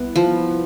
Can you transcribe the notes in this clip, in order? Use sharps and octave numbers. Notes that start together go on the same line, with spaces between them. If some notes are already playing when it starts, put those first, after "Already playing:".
Already playing: C2 B3 E4 B4
F3